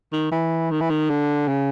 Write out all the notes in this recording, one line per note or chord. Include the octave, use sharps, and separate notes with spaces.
D#3
E3
D#3
E3
D#3
D3
C#3